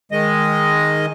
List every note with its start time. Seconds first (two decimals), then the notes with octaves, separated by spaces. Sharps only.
0.12 D#3 G#3 D#5